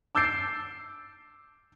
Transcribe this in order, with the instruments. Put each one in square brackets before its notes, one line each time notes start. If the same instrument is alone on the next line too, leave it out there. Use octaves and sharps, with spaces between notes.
[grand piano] D6 E6 G6 A6 C7 D7